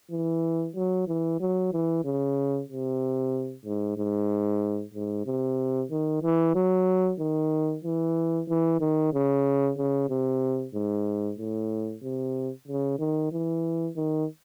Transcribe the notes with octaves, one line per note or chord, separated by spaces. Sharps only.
E3
F#3
E3
F#3
E3
C#3
C3
G#2
G#2
G#2
C3
D#3
E3
F#3
D#3
E3
E3
D#3
C#3
C#3
C3
G#2
A2
C3
C#3
D#3
E3
D#3